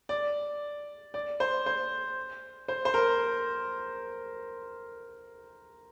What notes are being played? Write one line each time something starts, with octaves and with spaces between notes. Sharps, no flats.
D5
D5
C5
C5
C5
C5
A#4